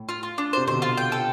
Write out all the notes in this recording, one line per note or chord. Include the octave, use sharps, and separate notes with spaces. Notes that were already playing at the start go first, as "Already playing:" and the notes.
Already playing: A2
F4
F4
D4
C3 C5
B2 D3 C5
F4
G5
A4